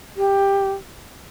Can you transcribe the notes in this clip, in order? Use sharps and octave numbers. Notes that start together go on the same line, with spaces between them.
G4